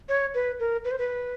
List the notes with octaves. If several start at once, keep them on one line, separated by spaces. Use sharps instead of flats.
C#5
B4
A#4
B4
C5
B4